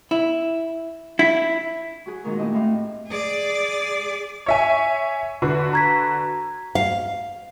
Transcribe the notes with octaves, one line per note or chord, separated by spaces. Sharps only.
E4
E4
F#3 F#4 G#4
A#2 D#3 F#3 G#3 A#4
G#3 A3 C#4 E4 G4 D#5
A2 C4 F5
G#4 D5
C#5 E5 G#5
D3 F#4 B4
A#5 G#6 B6
F5